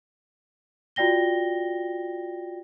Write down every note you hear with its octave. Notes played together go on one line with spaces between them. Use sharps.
F4 F#4 D5 G5 A#6 G7